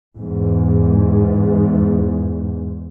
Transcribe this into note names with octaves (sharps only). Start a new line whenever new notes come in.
E2 G#2